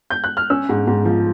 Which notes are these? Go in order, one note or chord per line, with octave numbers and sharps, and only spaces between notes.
G6
F#6
F6
C#4 E6
G#2
G#2
F3